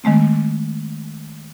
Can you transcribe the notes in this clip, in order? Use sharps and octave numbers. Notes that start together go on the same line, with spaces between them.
D#3 G#3 A3 C4